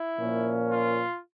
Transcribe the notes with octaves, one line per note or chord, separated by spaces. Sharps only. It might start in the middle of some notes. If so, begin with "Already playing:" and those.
Already playing: E4
A#2 F3 A#3 C#4
F4